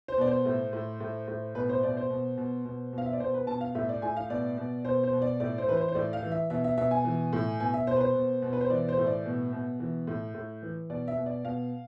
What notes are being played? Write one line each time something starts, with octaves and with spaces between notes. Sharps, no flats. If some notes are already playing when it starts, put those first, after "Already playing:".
C5
B2 D5
C5
A2
A2
A2
A2
B2 B4
C5
B2 D5
C5
B2
B2
B2
B2
F5
E5
D5
B2 C5
B4
B2 A5
F5
A2 E5
D5
A2 G#5
F5
B2 D5
B2
B2 C5
C5
B2
D5
A2 D5
C5
E3 B4
C5
C5
A2 D5
F5
E3
E5
B2 E5
E5
B2 E5
G#5
E3
A2
B2 G#5
E5
B2 C5
B4
C5
B2
B2
B4
C5
E3 D5
C5
A2
D5
B2
B2
E3
A2
A2
E3
B2 D5
E5
B2
D5
B2 F5